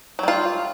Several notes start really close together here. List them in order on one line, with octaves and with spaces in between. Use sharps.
F#3 G3 F4